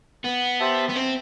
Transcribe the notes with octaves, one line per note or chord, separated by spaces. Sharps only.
B3
G4 C5 E5 A5
B3
C4